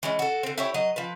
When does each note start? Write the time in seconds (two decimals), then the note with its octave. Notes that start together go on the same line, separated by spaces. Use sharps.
0.03 E3 G#3 C#4
0.19 F#4 A4
0.43 D3 C4
0.58 E4 G4 C#5
0.74 F#3 D#5
0.96 F3 B4